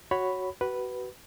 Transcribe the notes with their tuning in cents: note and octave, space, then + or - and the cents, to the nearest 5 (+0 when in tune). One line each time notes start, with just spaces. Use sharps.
F#4 +0 C#5 +0 B5 +0
F#4 +30 B4 +0